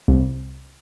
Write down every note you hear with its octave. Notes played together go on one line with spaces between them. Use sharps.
C2